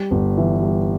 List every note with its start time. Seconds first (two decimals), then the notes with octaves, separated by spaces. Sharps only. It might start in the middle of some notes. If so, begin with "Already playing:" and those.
Already playing: G3
0.11 G1
0.37 E3
0.63 G3